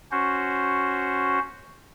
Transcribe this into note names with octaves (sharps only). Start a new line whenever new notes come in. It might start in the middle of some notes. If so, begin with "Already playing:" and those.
C#4 F#4 C5